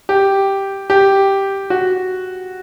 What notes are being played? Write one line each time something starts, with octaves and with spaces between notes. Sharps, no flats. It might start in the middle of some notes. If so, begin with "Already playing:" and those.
G4
G4
F#4